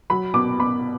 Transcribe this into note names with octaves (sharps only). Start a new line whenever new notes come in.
F#3 B5
B2 D6
B2 B5